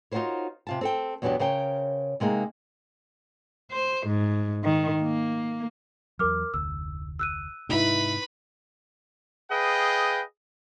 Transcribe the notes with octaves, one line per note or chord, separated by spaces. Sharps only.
D#4 F4 F#4 A#4 C5 C#5
C3 F4 A5
C4 A4 G5
E2 B2 F#3 B3 D4 G4
C#3 A#4 C5 C#5 G5
C3 G#3 A#3 D#4
C5
G#2
D#3
A#3
E2 F#3 A#4 D6 F6
F1 D2 E6
E6 F#6 D#7
G#2 C3 D#4 E4 B4 B5
G#4 B4 D#5 F5 G5